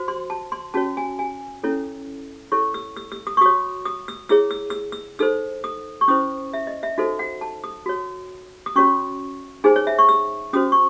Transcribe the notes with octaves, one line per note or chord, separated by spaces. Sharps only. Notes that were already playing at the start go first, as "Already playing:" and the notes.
Already playing: F#4 C5
C6
A5
C6
C#4 F#4 C#5 A5
G#5
G#5
C#4 E4 A4 C#5
E4 A4 C#5 C#6
E6
E6
E6
D#6
C#6
F#4 C#5 D#6
D#6
E6
E4 G#4 C#5 E6
E6
E6
E6
D#4 A4 C5 E6
D#6
C#6
C#4 E4 C5 D#6
E5
D#5
E5
D#4 F#4 A4 C5
F#5
A5
D#6
F#4 C#5
D#6
C#4 F#4 C#5 C#6
D#4 G#4 C5 G#5
C#5
E5
C#6
E6
C#4 F#4 C5 D#6
C#6